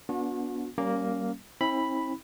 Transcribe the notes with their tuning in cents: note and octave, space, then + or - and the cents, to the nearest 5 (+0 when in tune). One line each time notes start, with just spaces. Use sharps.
B3 -20 D4 -30 F#4 -40
G3 -35 A#3 +0 C#4 +0
C4 +35 E4 -40 B5 +0